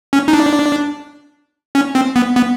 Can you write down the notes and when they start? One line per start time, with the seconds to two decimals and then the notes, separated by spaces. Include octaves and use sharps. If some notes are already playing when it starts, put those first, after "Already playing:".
0.13 C#4
0.28 D#4
0.33 D4
1.75 C#4
1.95 C4
2.16 B3
2.36 B3